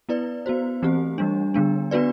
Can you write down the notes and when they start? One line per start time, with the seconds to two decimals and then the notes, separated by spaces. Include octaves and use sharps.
0.09 B3 E4 B4 D5
0.46 B3 F#4 C5
0.82 E3 A3 C4 G4
1.18 E3 G3 D4
1.54 D3 G3 B3 D4
1.91 B3 D4 F#4 B4 D5